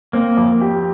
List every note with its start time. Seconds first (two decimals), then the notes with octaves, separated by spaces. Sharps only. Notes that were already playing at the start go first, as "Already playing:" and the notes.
0.13 A#3 C4
0.37 F2
0.61 G4